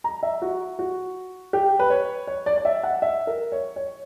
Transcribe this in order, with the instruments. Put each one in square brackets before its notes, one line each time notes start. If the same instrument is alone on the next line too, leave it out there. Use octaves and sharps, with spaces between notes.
[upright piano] A#5
E5
F#4
F#4
G4
B4
C#5
C#5
D5
D5
E5
F#5
E5
A#4
C#5
C#5